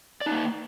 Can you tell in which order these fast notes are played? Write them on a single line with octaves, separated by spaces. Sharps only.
D5 D#4 A#3